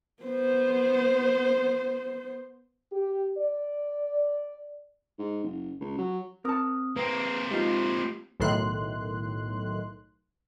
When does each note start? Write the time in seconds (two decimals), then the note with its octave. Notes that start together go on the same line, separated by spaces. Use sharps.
0.23 B3 C5
2.92 G4
3.38 D5
5.19 G#2
5.44 F#1
5.81 C#2
5.98 F#3
6.45 C4 A#4 A5 D#6
6.96 A#3 C4 B4
7.51 G#3 D#4 F4 G4 C7
8.40 B1 A2 D#3 C6 F#6